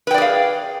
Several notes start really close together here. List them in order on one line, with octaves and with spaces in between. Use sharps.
B4 G5 D5 G#4 F5